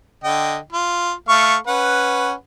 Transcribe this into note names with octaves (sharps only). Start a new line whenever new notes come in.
D3 D#5 G5
F4
A3 F5 C#6
C#4 B4 F#5